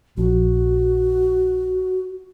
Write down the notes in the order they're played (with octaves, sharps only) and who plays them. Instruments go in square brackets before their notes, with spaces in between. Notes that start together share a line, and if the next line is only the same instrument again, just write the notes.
[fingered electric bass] A#1 F3 [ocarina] F#4